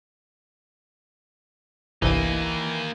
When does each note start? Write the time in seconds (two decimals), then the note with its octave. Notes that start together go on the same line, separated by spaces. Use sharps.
2.02 G1 C2 E3 A#3 D#4 D#7